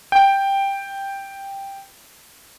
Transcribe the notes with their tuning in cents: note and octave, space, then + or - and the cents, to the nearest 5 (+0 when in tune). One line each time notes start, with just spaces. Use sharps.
G5 +5